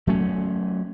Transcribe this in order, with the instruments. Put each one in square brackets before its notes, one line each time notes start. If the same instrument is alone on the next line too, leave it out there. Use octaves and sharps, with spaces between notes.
[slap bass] F#3 A3 C#4